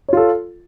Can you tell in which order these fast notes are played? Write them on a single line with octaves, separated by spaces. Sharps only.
C#5 F4 A4